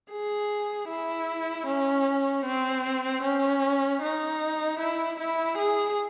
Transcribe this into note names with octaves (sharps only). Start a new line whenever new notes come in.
G#4
E4
C#4
C4
C#4
D#4
E4
E4
G#4